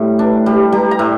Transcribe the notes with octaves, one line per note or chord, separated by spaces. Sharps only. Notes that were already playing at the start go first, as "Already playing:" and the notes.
Already playing: A2 G3
D4
G3
G3 A#5
A#5
A2